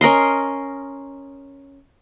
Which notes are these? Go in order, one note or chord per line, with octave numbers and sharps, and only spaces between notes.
C#4 A#4 D#5 C6